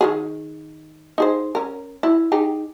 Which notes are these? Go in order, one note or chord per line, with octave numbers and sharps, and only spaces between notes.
D#3 G3 G#4
D#4 G#4 C5
C#4 A#4
E4
D#4 G4 G#4